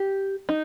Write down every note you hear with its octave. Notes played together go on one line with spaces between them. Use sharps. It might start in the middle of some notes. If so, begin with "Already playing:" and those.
Already playing: G4
D#4